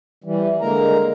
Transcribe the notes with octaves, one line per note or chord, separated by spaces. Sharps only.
E3 G3
D3 G#3 A#3 A#4 A#5